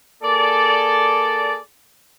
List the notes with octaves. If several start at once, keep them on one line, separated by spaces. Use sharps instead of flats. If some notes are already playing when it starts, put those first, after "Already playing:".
A#3 G#4 A4 D5